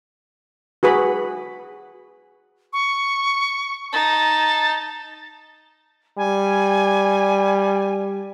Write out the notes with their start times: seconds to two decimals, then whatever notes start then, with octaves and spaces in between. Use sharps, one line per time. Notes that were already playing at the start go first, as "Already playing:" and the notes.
0.83 F#4 G#4 B4 B5
2.73 C#6
3.92 D#4 A5
6.18 G3 G#5